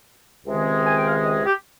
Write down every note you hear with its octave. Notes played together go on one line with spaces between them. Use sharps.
C#2 C3 D#3 G#3 C4
G#5
G5
F5
D#5
G4